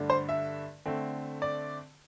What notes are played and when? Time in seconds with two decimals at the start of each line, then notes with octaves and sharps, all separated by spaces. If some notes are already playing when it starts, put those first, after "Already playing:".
Already playing: G2 D3 A3 D4
0.10 C5
0.29 E5
0.86 D3 A3 C4
1.42 D5